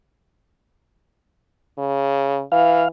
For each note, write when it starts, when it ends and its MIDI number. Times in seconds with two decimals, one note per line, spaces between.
1.78 2.42 49
2.52 2.85 52
2.52 2.88 77